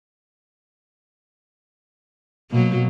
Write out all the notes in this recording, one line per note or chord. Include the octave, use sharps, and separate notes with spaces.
B2 F#3 A#3